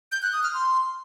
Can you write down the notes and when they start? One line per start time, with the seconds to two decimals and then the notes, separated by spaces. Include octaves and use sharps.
0.12 G6
0.22 F#6
0.33 D#6
0.43 F6
0.54 C6